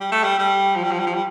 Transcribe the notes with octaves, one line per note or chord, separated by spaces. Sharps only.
G3
A3
G3
G3
F3
G3
F3
G3
F3
G3